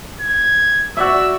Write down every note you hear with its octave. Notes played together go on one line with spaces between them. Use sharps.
G#6
F#4 D5 E5 E6